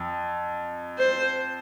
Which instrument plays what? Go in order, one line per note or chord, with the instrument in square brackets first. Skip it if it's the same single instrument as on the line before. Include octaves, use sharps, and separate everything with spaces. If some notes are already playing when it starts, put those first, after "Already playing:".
Already playing: [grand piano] F2
[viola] C5